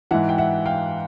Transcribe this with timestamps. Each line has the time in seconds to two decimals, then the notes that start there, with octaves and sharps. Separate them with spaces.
0.11 G#2 E3 E5 F#5
0.29 G5
0.38 E5 F#5
0.65 F5 G5